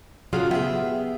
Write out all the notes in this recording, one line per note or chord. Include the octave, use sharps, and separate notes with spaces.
G2 C#3 F#3 F4 G#4 F6
B3 G#4 E5 G5